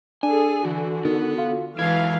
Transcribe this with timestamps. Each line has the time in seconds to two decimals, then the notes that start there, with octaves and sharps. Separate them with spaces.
0.23 D4 G#4 A4 G#5
0.65 D3 E3 F#4
1.05 D#3 B3
1.38 F4
1.79 E3 F#3 G#3 E4 F5 G#6